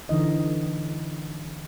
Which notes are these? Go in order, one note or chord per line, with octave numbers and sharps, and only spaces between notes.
D3 E3 D#4 D#5